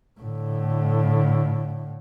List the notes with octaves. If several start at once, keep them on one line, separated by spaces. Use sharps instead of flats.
A2 D3